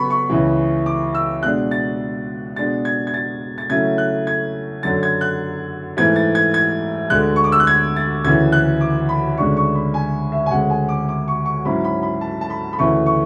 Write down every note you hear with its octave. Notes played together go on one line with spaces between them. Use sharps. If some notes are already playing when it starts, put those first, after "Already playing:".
Already playing: C#3 F#3 B3 B5 C#6
C#6
C#2 C#3 E3
D6
E6
B2 G#3 D4 F#6
A6
B2 G#3 D4 A6
G#6
G#6
A6
A6
C#3 F#3 A3 C#4 E4 G#6
F#6
G#6
F#2 D3 F#3 A6
G#6
F#6
G#2 E3 A3 E4 G#6
A6
G#6
G#6
D2 D3 G#3 F#6
C#6
D6
E6
F#6
G#6
A6
D2 C#3 E3 G#6
F#6
D6
B5
D2 C#3 G#3 D4 C#6
C#6
B5
G#5
E5
G#5
D2 C#3 G#3 F#5
G#5
D6
D6
C#6
C#6
G#2 F#3 C#4 E4 B5
B5
B5
A5
A5
B5
B5
D2 C#3 E3 A3 C#6
C#6